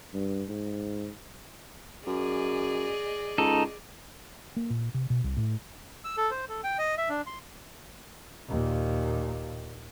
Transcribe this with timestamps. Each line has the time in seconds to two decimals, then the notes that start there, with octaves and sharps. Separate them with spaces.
0.14 G2
0.49 G#2
2.07 F#2 G#4 D5 D#5
3.38 C#2 D#4 A4
4.56 A#3
4.70 A#2
4.94 C3
5.10 B2
5.24 C2
5.37 A2
6.05 E6
6.17 A4
6.31 C5
6.49 A4
6.64 G5
6.78 D#5
6.98 E5
7.09 D4
7.27 C6
8.49 D#2 A#2